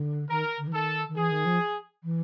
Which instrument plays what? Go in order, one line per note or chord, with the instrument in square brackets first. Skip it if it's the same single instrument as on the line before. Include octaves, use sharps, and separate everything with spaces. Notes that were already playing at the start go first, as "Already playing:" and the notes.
Already playing: [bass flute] D3
[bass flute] D#3 [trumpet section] A#4
[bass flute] D3
E3
[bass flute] D#3 [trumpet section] A4
[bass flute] D#3
[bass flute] E3 [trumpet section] G#4
[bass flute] D#3
F3
E3